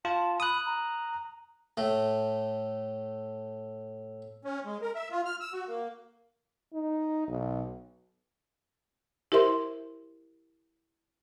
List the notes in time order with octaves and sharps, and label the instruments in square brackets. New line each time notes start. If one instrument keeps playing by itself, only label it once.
[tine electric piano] F4 [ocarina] A5
[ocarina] B5 [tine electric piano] D#6 F#6
[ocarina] A#5
[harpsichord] A2 A3
[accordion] C#4
G#3
A#4
E5
F4
F6
E6
F#4
A#3
[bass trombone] D#4
B1
[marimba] E4 G4 A#4 C5 E5 C6